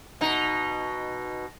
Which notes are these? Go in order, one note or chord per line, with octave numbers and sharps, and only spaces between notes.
B2 D#4